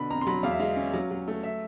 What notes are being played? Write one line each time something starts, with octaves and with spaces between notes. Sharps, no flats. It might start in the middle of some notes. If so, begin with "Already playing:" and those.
Already playing: B2 D3 B5
F2 A#5
C6
F#3 B5
E2 F5
E5
G#3 F5
C#4
F#3
F#3
A3
E5